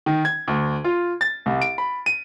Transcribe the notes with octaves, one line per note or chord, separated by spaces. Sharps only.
D#3
G#6
D2
F4
A6
C2
D7
B5
D#7